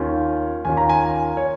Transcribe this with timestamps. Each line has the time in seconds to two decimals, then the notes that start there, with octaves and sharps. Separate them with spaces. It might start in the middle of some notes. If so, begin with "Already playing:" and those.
Already playing: D#2 D#3 C#4 F4
0.65 D#2 D#3 C#4 F4 G#5
0.77 A#5
0.89 G#5
1.37 C#5